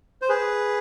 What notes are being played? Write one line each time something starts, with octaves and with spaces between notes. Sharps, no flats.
C5
G#4 B4